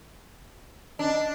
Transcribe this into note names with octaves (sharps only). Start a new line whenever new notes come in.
D4 D#5